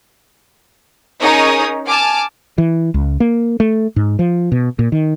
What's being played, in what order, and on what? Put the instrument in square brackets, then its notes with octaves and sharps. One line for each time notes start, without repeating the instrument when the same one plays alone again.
[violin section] C#4 D#4 G#4 A#4 C#5 D#6
G#5 A5 D6 F6
[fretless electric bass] E3
C#2
A#3
A3
G#2
F3
B2
A#2
D#3